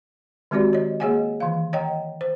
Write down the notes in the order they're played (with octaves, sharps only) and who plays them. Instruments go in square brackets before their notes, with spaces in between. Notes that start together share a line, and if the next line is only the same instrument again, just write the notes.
[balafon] D#3 G#3 C4 F#4 G4 D5
C#5 D#5
A#3 G#4 C#5 D#5 F#5 G#5
D#3 E3 F5
C#5 D#5 F#5 G5 A#5
C5